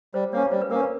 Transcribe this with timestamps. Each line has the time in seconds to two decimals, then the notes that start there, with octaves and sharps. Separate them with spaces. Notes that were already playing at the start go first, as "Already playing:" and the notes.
0.14 G3 C5
0.33 A#3 C#4 C#5
0.51 G3 C5
0.62 B4
0.71 A#3 C#4 A#4
0.80 B4